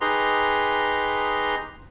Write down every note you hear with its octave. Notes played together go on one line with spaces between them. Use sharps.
D#4 G4 G#4 B4 A#5 C6